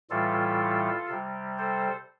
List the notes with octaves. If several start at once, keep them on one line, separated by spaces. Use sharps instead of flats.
A2 E3 G3 F4 A4
C3 G3
A4 C5